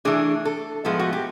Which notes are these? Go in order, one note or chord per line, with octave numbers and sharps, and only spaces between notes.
E3 A3 D4 G#4
A4
A2 F3 G#3 B3 A4
F#4
G4